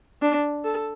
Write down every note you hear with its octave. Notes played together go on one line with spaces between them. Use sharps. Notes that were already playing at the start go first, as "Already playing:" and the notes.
D4
A4